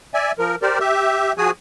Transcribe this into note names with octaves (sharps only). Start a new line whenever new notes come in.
D5 E5 G#5
F3 A#4
G4 A#4 C5 D5
G4 E5
F3 F#4 G#4 G#5 D#6